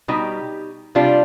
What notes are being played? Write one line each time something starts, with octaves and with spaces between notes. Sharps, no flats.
B2 G3 D#4 G4
C3 G3 D4 F4